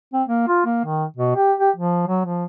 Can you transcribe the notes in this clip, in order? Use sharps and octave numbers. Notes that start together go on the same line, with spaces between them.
C4
A#3
F4
A#3
D#3
B2
G4
G4
F3
F#3
F3